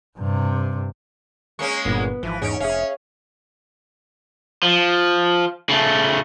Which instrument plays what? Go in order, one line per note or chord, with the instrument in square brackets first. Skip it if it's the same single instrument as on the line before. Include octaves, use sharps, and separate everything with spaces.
[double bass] G2 C3
[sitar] G#3 A#3 C#4 [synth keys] C#6
[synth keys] G1 A#2 [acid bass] B3
[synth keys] G#1 [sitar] E3 [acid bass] F3
[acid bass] E2 [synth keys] G#2 D#4 D7 [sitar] C#4
[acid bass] F1 [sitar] C#4 [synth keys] G#4 F5 [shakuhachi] E5
[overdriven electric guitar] F3
C#3 A3